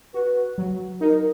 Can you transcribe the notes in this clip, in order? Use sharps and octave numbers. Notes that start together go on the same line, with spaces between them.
F#4 B4
F#3
D#4 A#4